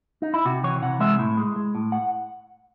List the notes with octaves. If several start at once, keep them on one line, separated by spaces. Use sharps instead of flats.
D#4
E4
C3 F#4
E3 C#5
C3 F#5
G#3 E5
A2
G#3
G#3
A2
F#5